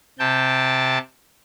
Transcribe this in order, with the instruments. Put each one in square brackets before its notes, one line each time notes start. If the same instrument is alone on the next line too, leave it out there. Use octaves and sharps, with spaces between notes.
[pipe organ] C3 G5 A5